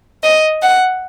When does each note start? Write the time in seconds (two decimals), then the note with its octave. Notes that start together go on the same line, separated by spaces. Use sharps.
0.23 D#5
0.62 F#5